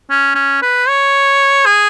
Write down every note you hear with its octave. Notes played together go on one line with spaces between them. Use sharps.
C#4
C#4
B4
C#5
G#4